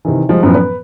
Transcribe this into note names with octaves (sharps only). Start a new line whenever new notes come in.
C3 D#3 E3
F3 G3 G#3 D#4
F#2 A2 D3 E3 F3 B3
B4